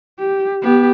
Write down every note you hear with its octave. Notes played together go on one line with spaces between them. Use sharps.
G4
B3 G4